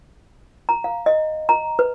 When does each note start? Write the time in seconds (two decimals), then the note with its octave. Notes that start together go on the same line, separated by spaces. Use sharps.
0.69 A#5
0.84 F5
1.06 D#5
1.49 A#5
1.79 B4